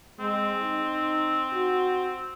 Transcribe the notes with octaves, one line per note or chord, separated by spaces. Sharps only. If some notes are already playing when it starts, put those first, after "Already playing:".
G#3 C4
D#4
F#4